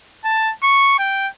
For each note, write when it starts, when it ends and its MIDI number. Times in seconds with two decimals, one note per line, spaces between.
0.25 0.52 81
0.63 0.95 85
0.99 1.28 79